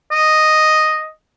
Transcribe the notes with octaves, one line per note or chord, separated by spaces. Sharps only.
D#5